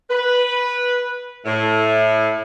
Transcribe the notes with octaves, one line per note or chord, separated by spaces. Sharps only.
B4
A2